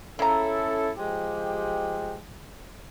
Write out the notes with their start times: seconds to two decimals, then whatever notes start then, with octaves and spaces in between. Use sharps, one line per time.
0.19 C#3 C#4 E4 A4 A#5
0.97 F3 G#3 G4